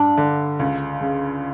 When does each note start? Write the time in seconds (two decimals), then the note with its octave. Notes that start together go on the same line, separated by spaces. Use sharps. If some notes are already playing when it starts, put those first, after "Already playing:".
Already playing: G2 D4
0.18 D3
0.59 C#2
1.01 C#3